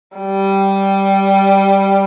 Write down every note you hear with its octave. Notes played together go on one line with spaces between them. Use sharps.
G3